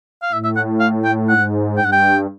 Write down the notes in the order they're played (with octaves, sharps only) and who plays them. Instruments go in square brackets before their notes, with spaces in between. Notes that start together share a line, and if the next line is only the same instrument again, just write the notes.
[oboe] F5
[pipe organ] A2 [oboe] E5
[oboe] E5
F#5
F5
G5
[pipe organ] G#2 [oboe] F#5
[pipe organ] G2 [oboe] G5
[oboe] F#5
G5